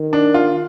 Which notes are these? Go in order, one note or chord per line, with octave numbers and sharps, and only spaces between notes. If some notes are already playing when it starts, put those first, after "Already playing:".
Already playing: D#3
D4
F4